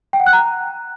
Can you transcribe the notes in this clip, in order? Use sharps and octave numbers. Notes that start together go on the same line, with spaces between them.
G5
F#5
F#6
A#5